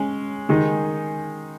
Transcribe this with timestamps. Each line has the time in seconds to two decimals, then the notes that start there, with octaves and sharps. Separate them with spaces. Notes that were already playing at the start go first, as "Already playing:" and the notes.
Already playing: G#3 C#4
0.49 D#3 G#3 D#4 G#4